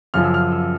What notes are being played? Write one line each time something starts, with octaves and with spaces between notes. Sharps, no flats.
F#2 C#3 F3 F6
E6
F6
E6